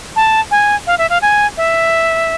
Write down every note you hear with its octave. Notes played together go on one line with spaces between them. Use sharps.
A5
G#5
F5
E5
F5
G#5
E5